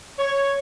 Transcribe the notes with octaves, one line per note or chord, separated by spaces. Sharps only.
C#5